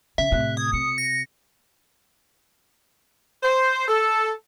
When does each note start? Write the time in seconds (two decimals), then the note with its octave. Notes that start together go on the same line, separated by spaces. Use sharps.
0.18 C#3 E5
0.32 A2 C3 F#6
0.57 D#6 G#6
0.73 C3 C#7
0.98 A#6
3.43 C5
3.88 A4